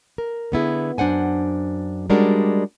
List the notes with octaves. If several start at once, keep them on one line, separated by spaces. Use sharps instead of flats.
A#4
D3 B3 E4 G#4
F#2 D4 C5 F#5 G#5
G3 G#3 C#4 D4 F#4 A#4